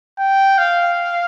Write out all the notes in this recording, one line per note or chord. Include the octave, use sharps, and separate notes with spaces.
G5
F5